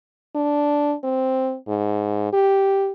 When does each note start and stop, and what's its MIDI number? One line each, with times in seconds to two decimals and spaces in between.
0.35 0.95 62
1.04 1.56 60
1.68 2.28 44
2.33 2.92 67